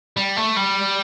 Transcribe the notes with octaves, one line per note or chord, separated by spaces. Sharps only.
G3
A3
G3